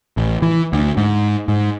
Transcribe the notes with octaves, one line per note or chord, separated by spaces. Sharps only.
A1
E3
D2
G#2
G#2